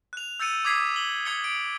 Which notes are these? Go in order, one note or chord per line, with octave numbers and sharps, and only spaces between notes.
F#6 F7
E6 G6 A6 C#7 D#7
D6 D#6 G#6 B6 C7
F#7 G7
D#6 G#6 C#7 G7
D7